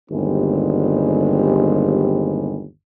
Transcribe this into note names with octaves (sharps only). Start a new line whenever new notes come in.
G1 D#2 G3 G#3 C4